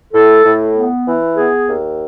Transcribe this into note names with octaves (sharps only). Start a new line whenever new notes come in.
A2 A4
A2
B3
E3
B3 G#4
D#2